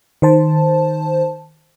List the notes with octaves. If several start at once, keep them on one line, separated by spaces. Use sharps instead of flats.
D#3 C5 A5